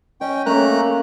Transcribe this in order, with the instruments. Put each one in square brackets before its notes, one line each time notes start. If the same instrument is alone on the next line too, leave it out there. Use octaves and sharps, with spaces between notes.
[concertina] C#4 G5 [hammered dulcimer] D#5
[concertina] A3 A#5 F#6 [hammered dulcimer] A#3 C#4